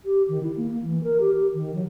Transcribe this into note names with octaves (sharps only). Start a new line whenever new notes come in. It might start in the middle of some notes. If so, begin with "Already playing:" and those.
G4
D#3
E4
A#3
A#3
E3
A#4
G4
G4
D#3
F#3